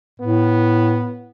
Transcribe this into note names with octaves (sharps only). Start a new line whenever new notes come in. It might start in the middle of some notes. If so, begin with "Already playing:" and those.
A2 B3